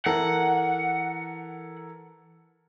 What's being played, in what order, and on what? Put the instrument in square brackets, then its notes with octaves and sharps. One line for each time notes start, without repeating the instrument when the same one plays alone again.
[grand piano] E3 A4 A#4 [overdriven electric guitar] F#5